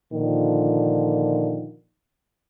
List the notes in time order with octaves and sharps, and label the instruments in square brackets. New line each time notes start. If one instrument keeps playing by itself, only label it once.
[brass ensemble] A#2 D3 D#3 F3